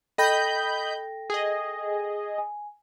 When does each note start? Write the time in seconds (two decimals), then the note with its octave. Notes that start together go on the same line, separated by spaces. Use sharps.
0.18 A4 D#5 G5 B5 G6 A#6
1.30 G#4 D#5
2.38 G#5